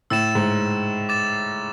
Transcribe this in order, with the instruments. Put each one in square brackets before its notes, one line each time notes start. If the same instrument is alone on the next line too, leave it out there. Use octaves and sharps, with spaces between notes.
[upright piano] A2 [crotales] E6 A6 E7
[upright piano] G#2
[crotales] D6 A6 E7